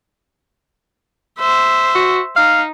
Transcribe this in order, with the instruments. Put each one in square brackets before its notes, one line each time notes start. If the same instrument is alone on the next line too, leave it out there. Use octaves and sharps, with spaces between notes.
[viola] C5 E5
[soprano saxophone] F#4
[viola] D#4 [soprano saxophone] F5